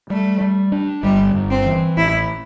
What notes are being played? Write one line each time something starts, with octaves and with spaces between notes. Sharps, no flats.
G3 A3
G3
D4
G1 G3
G1
C4
E3
A1 E4